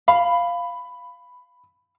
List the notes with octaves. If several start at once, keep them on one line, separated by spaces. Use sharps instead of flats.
F5 B5